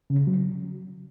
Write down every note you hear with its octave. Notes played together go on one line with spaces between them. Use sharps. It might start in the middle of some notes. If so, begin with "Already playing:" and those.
C#3
F#3